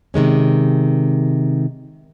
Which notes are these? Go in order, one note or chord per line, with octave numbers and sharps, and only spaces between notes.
C3 D#3 G#3 C#4